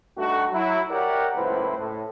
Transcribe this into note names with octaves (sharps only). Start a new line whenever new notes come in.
G2 A3 D#4 F#4
F#3 E4
G4 A#4 C#5 D5 E5 F#5
F#1 C#2 A2 E4 B4 C5
A2